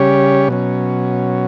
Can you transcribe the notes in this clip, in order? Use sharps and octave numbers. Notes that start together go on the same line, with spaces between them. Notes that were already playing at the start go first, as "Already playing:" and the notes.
Already playing: C#3 G3 C#4 G4 C#5
B2 F#3 C#4